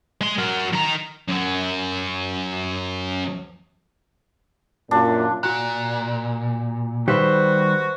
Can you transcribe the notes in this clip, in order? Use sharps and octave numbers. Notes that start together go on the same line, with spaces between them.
G#3 C6
F#3 A#4
D#3 A#5
F#2 F#3
F#2 A#2 D4
A#2 F#4 F#6
D#3 G3 F#4 G4 B4 C5 E5